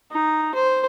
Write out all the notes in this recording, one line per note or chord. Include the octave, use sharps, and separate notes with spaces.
D#4
C5